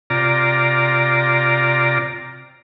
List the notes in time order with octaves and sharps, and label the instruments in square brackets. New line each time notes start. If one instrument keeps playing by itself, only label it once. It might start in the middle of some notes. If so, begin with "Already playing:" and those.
[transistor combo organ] C3 F4 D5 A#5